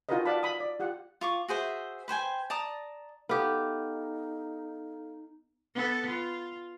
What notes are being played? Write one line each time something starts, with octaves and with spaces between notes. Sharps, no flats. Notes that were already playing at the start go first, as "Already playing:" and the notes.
D#4 F4 F#4 A#4 B4 D#5
F#4 D5 F5 F#5 A5 B5
B5 D#6
D5
F4 G4 F#5
F4 C#6 D6
F#4 G#4 C5 E5
B4 C5 G5 G#5
D5 A5 A#5 D#6
B3 D#4 G4 A4 F5 F6
B3 A4
F4